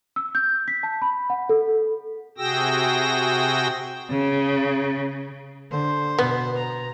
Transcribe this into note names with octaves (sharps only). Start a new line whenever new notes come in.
E6
G6
B6
A5
B5
F#5
A4
C3 F#4 G#4 G5 E6 A#6
C#3
D3 C5
B2 B3
A#5